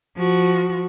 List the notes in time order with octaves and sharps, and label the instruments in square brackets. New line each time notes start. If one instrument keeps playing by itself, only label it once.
[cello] F3 F#4